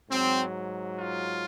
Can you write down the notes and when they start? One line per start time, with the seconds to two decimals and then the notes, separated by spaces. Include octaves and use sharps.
0.10 G#2 F#3 C4
1.00 F4